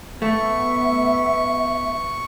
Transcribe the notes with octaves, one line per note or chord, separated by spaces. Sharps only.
A3 B3 E5 C#6